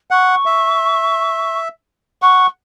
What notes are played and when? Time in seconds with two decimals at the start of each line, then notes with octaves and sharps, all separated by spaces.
0.11 F#5 C#6
0.46 E5
2.22 F#5 C#6